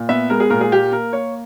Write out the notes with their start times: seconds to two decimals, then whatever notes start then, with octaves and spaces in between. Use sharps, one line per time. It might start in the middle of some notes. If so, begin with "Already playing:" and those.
Already playing: A#2
0.09 B3 E5
0.30 G#3 A#4
0.40 G#4
0.50 A#2 A#4
0.61 G#4
0.72 A#3 G4
0.92 A#3 A#4
1.13 A#3 C#5